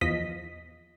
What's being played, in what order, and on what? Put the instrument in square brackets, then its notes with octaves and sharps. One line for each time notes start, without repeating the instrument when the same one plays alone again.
[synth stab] E2 F3 D#5 B6